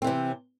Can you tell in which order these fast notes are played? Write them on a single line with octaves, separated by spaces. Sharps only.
C4 E3 C3